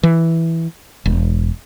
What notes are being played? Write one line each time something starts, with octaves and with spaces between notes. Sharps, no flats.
E3
E1